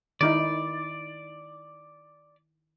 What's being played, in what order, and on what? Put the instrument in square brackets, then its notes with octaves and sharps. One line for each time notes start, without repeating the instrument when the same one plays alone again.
[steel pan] D#3 D#4 E4 [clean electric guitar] D5